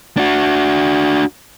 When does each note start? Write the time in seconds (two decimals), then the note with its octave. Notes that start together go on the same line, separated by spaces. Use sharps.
0.17 D4 F#4